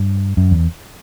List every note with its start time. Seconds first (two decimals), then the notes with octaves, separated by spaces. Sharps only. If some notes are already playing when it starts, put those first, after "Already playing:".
Already playing: G2
0.37 F#2
0.51 E2